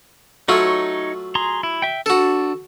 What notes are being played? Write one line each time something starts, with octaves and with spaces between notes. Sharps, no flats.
F#3 A3 D#4 F4 C#5
G#4 A#5 C6
E4
E5 G5
D4 F#4 A4